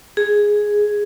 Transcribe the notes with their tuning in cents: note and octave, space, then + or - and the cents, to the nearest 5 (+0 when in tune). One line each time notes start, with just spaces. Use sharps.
G#4 +0